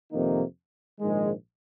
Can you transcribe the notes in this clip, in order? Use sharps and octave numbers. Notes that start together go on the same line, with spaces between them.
F2 C3 D#3 A#3 D#4
A#1 G#2 D#3 G#3